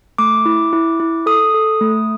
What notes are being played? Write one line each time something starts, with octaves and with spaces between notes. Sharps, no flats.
A3 D6
E4
E4
E4
A4 D#6
A4
A3